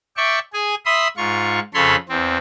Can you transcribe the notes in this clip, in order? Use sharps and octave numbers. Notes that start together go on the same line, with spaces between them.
D5 E5 G5 C#6
G#4 G#5
E5 B5 C6 D#6
G#2 F4 C#6
F2 C#3 A4 C#5 B5 C6
E2 C4